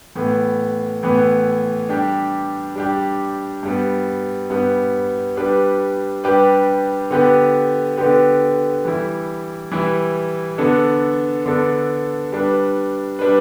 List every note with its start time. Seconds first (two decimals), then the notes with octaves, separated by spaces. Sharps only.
0.15 A2 E3 B3
1.03 A2 E3 B3
1.89 G3 D4 G4
2.75 G3 D4 G4
3.63 G2 G3 B3
4.50 G2 G3 B3
5.37 G3 D4 G4 B4
6.24 G3 D4 G4 B4
7.11 D3 B3 G4 B4
7.97 D3 B3 G4 B4
8.85 E3 G3 E4
9.72 E3 G3 E4
10.58 D3 B3 D4 A4
11.46 D3 B3 D4 A4
12.32 G3 D4 B4
13.19 G3 D4 B4